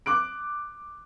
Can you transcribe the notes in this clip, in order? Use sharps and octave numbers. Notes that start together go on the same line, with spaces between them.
D6 F#6 D7